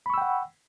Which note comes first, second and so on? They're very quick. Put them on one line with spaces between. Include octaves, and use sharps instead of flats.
B5 C#6 E6 G5 F#5